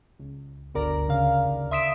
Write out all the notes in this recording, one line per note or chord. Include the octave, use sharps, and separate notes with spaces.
C#2
G1 D2 D3 A#4 D5 A#5
C#3 F5
D#2
E5 C6 D#6 B6 D7 E7